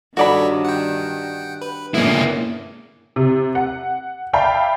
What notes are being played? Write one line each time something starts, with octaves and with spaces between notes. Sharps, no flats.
G2 D#3 F#4 A4 C#5 D5 B5
F#5 G5
B4
A#2 D3 G#3 A#3 B3 C#4 E4
C3
F#5
D5 E5 F5 G5 A5 B5